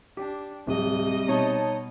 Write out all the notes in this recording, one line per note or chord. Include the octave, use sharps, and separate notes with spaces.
D4 G4
D1 C3 G3 D#5
B2 D#4 C#5 A5